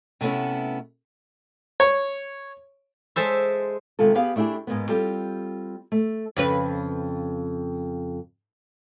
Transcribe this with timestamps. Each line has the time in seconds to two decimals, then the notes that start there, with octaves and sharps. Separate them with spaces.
0.21 C3 A3 B3 C#4 E4
1.80 C#5
3.16 G#3 A4 C5 E5
3.99 C3 D#3 G#3 F4 A4
4.15 B3 G4 G#4 B4 F5
4.36 A3 D4 E4 G4 G#4
4.67 G#2 G#3 A#3 B3
4.89 G3 C4 F4 G4 A4
5.92 A3
6.37 F2 C#3 B4